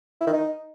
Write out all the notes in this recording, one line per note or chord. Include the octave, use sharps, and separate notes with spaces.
E4
D#3
D#4